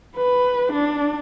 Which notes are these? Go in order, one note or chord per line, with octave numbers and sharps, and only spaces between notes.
B4
D4